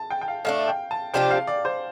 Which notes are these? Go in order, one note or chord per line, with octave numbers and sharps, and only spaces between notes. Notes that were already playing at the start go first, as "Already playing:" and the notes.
Already playing: A5
G5
G5
F5
A2 A3 D4 F5
G5
A5
C3 F3 D4 G4 G5
F5
D5
C5